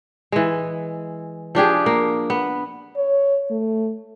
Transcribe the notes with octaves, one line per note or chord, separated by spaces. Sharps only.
E3 G#3
F3 D4 G4 G#4
A#3
B3
C#5
A3